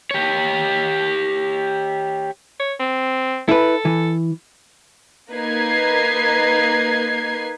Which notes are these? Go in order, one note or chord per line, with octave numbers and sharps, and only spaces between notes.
G4 C#5
C#5
C4
E4 A4 B4
E3
A#3 D#4 B4 G#6 C7